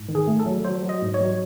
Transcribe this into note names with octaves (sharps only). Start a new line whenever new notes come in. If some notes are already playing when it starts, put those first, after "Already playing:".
Already playing: G#2
D#3
G#4
A3
A4
F#3
F#3 C5
F#3
D#5
G#2
C#5
F#3